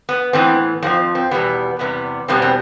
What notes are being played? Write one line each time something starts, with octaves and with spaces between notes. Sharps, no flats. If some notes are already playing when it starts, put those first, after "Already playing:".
B3
A2 E3 B3 C4
F2 D3 F3 C4
C4
E2 B2 G3 B3
E2 C3 G3 B3
E2 B2 G3 B3 C4
C4